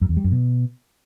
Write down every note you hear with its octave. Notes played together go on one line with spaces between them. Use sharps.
F#2
E2
G3
F#2
B2